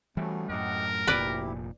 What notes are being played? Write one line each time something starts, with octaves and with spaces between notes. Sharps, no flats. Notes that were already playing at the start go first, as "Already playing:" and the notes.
E3 F#3 G3 A3 C#4
F#2 A2 G4 A#4 D#5 F#5
F1 D2 A#2 E4 G4 B4 D5